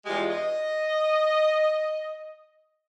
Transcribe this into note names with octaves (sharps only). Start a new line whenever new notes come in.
E2 G#3 F4 G4
D#5